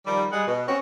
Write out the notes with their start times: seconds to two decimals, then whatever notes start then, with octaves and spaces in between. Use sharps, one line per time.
0.06 D#3 F3 G3
0.31 G3 G#3 G#4 F#5
0.47 B2
0.67 G#3 C4 C#4 F#4